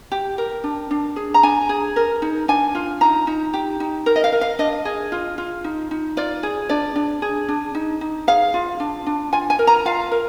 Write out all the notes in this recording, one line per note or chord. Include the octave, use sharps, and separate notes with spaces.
G4
A#4
D4
D4
G#4
A#5
D4 G#5
G#4
A#4
D#4
D4 G#5
F4
D#4 A#5
D#4
G4
D#4
A#4
D#5
F5
A#4
F5
D4 D#5
G#4
F4
F4
D#4
D#4
F4 D5
G#4
D4 D5
D4
G#4
D4
D#4
D#4
G#4 F5
F4
D4
D4
F4 G#5
G#5
A#4
A#5
F4 F5
A#4